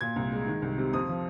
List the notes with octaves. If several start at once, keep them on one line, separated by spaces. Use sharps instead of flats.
A#2 G#6
C2
G#3
D#3
C2
C3
F2 D#6
F3